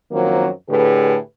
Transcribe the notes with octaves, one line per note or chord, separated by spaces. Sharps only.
F#2 D#3 F3 F#3 A#3 C4
A2 D3 G4 G#4 B4